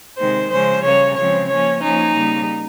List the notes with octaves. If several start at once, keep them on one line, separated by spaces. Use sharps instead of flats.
C3 D#3 G#3 C5
C#3 F3 G#3 C#4 C5
C#3 G3 A#3 C#5
C#3 F3 G#3 C4 C#5
F3 A#3 C#4 C#5
F3 A#3 C#4 D#4
C#3 G3 A#3